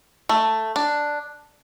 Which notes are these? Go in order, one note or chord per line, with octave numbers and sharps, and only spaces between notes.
A3
D4